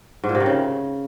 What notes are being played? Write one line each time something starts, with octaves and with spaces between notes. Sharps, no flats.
G#2
A#2
C3
D#3
C#3